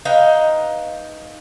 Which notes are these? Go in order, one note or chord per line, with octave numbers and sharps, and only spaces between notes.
D#4 B4 F5 G5